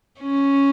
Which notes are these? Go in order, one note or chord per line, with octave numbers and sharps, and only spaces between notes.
C#4